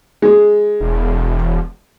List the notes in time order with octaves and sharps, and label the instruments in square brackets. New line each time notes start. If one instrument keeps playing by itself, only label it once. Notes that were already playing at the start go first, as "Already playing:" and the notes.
[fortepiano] G#3
[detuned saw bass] E1